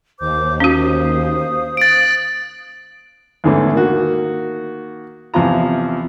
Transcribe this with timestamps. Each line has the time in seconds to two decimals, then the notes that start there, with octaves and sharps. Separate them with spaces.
0.20 D#2 C5 D6 G6
0.60 C#4 F#4 C5 F5 D#6
1.77 F#6 A6 D7
3.44 E2 G#2 D3 E3 A3 C#4
3.73 D#3 A#3 F#4
5.34 E2 C3 F3 F4 A#5